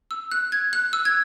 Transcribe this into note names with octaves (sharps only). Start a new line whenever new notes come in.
E6
F#6
G#6
F#6
E6
G#6